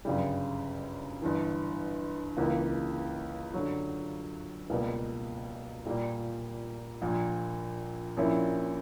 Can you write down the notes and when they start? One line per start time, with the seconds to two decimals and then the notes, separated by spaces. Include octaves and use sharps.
0.05 G1 F#2 C#3 G3
1.22 G1 G2 E3
2.37 C#2 C#3 E3 A#3
3.54 F#2 D3 F#3
4.70 C#2 B2 G3 A#3
5.85 A#2 G3 A#3
7.01 A#1 A#2 A#3
8.17 A#1 A#2 A#3 C#4 E4